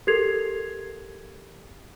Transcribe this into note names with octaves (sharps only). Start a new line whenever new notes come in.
G4 A4 A#4 G#6 C7 F7